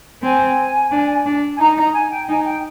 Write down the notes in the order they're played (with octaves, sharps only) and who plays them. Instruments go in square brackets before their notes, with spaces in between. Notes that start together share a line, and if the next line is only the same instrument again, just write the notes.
[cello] C4 [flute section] G#5
[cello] D4
D4
[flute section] G#5
[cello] D#4 [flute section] A#5
[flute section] A#5
G#5
G5
[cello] D#4 [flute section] G#5
[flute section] G5